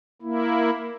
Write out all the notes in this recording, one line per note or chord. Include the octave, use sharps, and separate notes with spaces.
A#3 E4